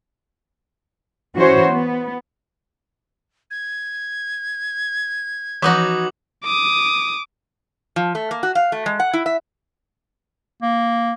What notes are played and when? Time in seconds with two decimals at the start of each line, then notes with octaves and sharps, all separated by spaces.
1.35 E3 C#4 F#4 C5 C#5
1.71 B3
3.51 G#6
5.62 E3 F3 B3 D#4 F#4 D6 D#6 F#7
6.44 D6 D#6
7.96 F3
8.15 A3
8.31 A#3
8.43 F#4
8.55 F5
8.72 A3
8.86 G#3
9.00 F#5
9.13 E4
9.26 E5
10.62 A#3